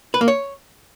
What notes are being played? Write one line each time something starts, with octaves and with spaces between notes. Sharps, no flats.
B4
A#3
C#5